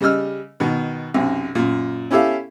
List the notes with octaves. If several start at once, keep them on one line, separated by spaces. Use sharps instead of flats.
C#3 G3 D#5 E6 F6
B2 D#3
B1 F#2 C3
F#2 A#2
C#4 E4 G4 A4 E5 F5